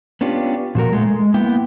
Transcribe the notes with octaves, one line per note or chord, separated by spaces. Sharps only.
B3 C#4 D4 F4 G4
A#2 F3 F#4 A#4
G#3 A3
G#3
A#3 B3 E4 G5